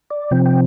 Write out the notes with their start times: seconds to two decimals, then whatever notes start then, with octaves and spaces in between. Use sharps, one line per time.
0.11 D5
0.31 C3 F3 C4 G5
0.46 G5